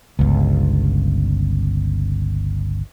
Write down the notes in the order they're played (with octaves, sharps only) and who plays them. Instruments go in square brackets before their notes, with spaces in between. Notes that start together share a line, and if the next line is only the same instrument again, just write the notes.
[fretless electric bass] G1 C#2